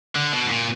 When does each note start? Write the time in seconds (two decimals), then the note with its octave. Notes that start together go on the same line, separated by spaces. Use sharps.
0.15 D3
0.33 B2
0.46 G#2
0.50 A#2